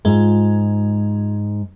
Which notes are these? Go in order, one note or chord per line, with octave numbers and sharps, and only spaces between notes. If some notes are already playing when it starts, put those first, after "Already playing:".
G#2 G#3 F4